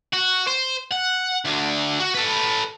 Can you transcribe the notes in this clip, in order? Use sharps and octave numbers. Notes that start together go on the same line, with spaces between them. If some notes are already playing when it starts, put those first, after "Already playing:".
F#4
C5
F#5
D2 D3
F#4
A4 B4